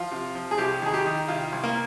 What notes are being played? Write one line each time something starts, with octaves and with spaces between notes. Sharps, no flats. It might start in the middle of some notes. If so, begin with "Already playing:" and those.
Already playing: F3 F4
C3
F3
G#4
C2 G4
D#3 G#4
G4
D#3
C2 F4
C2
A#3